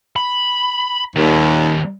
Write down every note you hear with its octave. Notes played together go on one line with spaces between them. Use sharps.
B5
D#2 D#3 G3